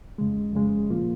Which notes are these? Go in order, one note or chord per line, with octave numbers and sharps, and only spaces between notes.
F2 C#3 G#3
F2 C#3 G#3
A#2 F3 A#3 F4